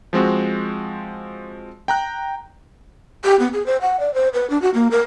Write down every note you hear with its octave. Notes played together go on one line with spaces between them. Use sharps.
F3 G#3 C4 F#4
G5 A#5 F#6
G4
B3
G#4
C5
F#5
D5
C5
B4
D4
F#4
A#3
A#4